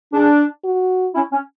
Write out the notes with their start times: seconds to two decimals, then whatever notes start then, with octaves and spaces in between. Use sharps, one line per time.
0.13 D4 G#4
0.64 F#4
1.15 C#4 E4
1.32 C#4